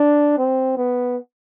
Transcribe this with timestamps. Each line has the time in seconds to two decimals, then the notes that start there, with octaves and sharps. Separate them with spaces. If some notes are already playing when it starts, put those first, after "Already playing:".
Already playing: D4
0.38 C4
0.77 B3